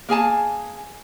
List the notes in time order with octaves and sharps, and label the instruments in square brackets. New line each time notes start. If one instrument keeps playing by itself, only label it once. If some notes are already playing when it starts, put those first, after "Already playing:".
[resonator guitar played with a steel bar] A#3 G#4 G#5 A5